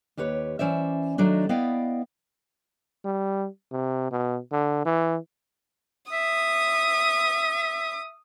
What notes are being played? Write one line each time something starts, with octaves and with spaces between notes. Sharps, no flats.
D#2 G4 B4 C#5
E3 C#4 C5 D5 E5
D#3 F#3 A3 D4 D#4
B3 E4 D5 D#5 F5 G5
G3
C3
B2
D3
E3
E5 D#6